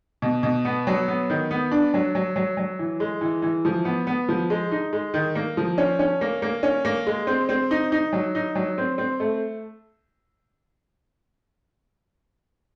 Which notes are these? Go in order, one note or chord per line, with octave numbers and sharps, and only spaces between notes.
B2
B2
B3
F#3
B3
D#3
B3
D4
F#3
F#3
F#3
F#3
E3
G#3
E3
E3
F3
B3
B3
F3
G#3
D#4
G#3
D#3
A#3
F3
C#4
C#4
A#3
A#3
C#4
A#3
G#3
C4
C4
D#4
D#4
F#3
D#4
F#3
C4
C4
A3